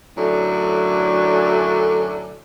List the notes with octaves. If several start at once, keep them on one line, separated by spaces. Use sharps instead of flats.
F#2 A2 D3 F#3 A3 D4